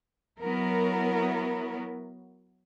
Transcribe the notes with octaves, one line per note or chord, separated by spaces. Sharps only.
F#3 B3 E4 A#4